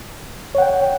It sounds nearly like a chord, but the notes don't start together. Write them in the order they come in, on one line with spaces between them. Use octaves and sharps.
C#5 F#5 G5